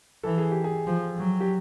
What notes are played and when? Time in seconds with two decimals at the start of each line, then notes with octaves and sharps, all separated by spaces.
0.23 E3 A4
0.38 G#4
0.51 G4
0.64 G#4
0.87 F3
1.18 F#3
1.40 G4